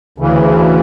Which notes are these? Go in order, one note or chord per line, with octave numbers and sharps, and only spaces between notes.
D2 C#3 E3